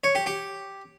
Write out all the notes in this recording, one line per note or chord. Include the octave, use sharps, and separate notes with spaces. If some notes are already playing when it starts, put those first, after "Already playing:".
C#5
G4
G4